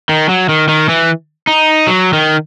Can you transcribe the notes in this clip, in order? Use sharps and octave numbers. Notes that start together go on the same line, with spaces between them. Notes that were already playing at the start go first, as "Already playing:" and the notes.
D#3
F#3
D#3
D#3
E3
D#4
F#3
D#3